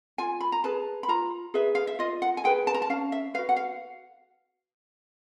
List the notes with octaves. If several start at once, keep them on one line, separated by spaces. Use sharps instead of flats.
F4 G#5
B5
A#5
G#4 B4 A5
B5
F4 A#5
G#4 B4 E5
F5
E5
F4 D#5
F#5
G#5
G#4 B4 G5
A5
A#5
A5
C#4 F5
E5
F#4 B4 F5
F#5
F5